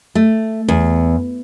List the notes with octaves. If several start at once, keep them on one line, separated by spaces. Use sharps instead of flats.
A3
E2